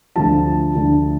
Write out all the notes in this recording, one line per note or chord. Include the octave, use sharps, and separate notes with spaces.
D2 D3 F3 A5
D2 D3 F3